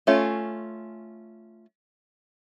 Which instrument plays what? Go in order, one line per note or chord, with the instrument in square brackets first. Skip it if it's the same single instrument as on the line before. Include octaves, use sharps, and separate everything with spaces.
[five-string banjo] A3 C#4 F4